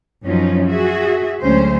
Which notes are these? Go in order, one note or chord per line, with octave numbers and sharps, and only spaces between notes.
F#2 F3 F#3 C#4 D#4
F#4 G#4 E5
D2 F#3 G#3 A3 C#4 C5